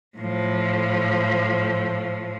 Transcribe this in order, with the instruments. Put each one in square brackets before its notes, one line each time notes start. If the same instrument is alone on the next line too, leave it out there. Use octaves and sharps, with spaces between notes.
[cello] A2 F3